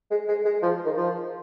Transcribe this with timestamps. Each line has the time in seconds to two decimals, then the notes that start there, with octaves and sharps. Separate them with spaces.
0.11 G#3
0.28 G#3
0.45 G#3
0.63 F3
0.85 D#3
0.97 F3